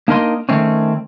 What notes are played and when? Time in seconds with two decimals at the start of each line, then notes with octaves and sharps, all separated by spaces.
0.08 A#3 D4 D#4 A#4 D#5 C6
0.49 D#3 A3 C4 C#4